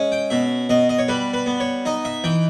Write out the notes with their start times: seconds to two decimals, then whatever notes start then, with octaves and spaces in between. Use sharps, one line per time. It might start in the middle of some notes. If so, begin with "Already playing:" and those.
Already playing: G#3 C#4
0.12 G5
0.30 B2 E5
0.69 B2 D#5
0.89 D#5
0.99 C#5
1.08 G3 B4
1.33 B4
1.46 B3
1.60 C#5
1.85 D#4 D#5
2.05 E5
2.24 E3 G5